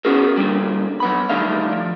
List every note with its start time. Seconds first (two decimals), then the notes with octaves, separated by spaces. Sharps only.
0.05 B3 C#4 F#4 G#4 A#4
0.38 A#2 D3 G3
1.00 F#3 B3 B5
1.30 D3 D#3 G3 A3 D4 F5
1.73 F3